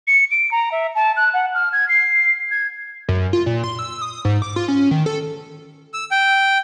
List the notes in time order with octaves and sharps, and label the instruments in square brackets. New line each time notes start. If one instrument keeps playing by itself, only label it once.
[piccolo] C#7
D7
A#5
E5
A5
F#6
F#5
F6
G#6
C7
G#6
[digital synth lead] F#2
F4
A#2
C6
E6
D#6
G#2
D6
F4
C#4
D#3
A4
[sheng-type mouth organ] E6
G5